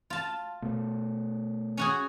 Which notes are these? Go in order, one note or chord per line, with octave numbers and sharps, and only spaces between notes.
F4 A5
B2 A3
C#4 F#4 G#4